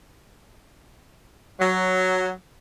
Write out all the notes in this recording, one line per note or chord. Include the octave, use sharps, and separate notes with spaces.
F#3